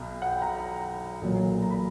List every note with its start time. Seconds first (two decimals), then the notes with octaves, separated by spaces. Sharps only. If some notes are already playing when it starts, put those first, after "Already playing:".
Already playing: B1 B2
0.22 F#5
0.26 G5
0.42 A#5
0.58 A#5
1.21 B1 A#2 F#3 A#3
1.62 A#5
1.70 B5